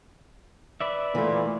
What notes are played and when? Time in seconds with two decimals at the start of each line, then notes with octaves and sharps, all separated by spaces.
0.81 B4 D5 E5
1.15 A#2 E3 A3